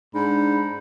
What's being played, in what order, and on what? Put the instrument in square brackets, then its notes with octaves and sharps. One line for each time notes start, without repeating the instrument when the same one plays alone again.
[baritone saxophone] G#2 [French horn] D4 [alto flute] B5